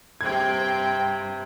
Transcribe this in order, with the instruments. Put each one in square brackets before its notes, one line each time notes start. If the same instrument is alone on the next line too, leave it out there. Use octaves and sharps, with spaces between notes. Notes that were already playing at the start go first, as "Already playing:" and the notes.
[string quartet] G2 C3 [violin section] C4 G5 [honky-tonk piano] G#6